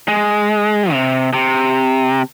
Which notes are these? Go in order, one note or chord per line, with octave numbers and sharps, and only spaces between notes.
G#3
C3
C3